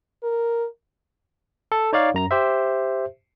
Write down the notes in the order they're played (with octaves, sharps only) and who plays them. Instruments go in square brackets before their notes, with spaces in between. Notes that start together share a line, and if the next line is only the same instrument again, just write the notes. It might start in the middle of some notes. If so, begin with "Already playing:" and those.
[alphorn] A#4
[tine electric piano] A4
D#4 C#5 D5 F5
F#2 A#5 A#6
G4 C5 E5